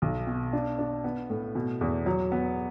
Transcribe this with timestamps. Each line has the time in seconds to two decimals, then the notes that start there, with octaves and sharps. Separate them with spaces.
0.02 B1
0.27 B2
0.53 D4
0.79 D4
1.04 B3
1.30 A2
1.55 B2
1.81 E2
2.06 F#3
2.32 B3